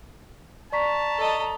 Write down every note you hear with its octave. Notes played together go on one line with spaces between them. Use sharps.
D5 A5 A#5 C#6 B6
A4 D#5